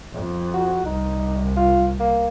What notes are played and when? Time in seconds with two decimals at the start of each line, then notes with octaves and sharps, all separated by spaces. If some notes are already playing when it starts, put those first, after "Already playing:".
0.13 F2
0.54 F#4
0.85 C2 D#4
1.56 F4
2.00 A#3